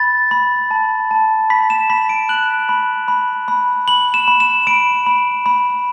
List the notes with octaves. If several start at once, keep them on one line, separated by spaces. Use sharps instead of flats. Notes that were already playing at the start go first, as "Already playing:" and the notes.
Already playing: B5 A6
B5
A5
A5
B5 B6
E7
B5 B6
D7
F#6 F#7
B5
B5
B5
B5 F#7
E7
B5
E7
B5 D7
B5
B5